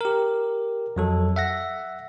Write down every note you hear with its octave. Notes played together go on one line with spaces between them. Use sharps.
G4 A#4
F2 F#3 A4
E5 F#5 A#6